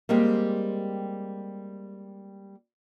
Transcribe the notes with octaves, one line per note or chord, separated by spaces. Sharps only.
G3 G#3 A#3 C4 G4